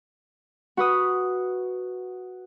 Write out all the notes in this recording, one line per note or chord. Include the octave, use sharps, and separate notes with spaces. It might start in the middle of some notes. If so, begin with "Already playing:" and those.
F#4 B4 D#6